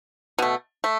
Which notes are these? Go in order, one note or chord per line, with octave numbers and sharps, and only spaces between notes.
B2 A3
A3